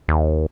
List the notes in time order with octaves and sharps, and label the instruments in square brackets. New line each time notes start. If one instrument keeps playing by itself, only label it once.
[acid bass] D#2